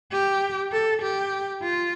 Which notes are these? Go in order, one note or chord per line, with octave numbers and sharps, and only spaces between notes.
G4
A4
G4
F4